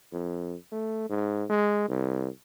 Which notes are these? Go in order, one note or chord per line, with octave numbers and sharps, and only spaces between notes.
F2
A3
G#2
G#3
C2